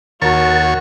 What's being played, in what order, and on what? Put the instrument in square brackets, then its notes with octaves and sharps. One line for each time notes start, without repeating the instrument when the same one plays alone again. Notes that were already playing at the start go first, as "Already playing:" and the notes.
[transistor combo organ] D#2 C#5 [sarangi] F#4 [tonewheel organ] A#4 A5